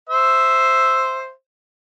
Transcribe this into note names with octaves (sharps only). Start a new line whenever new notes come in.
C5 E5